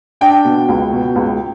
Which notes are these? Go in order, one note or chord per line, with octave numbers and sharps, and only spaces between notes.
D4 G5
B2
C#2
B2
C#2